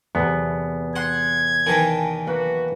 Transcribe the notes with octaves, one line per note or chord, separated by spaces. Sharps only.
E2 C3 A3 B3
F#5 C6 F#6 G#6 C7
D#3 E3 G#5 A5 D7
A#3 F#4 B4